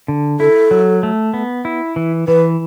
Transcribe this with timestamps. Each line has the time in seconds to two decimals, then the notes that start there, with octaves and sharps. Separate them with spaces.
0.08 D3
0.40 E4 A4
0.71 F#3
1.03 A3
1.34 B3
1.65 E4
1.96 E3
2.27 E3 B4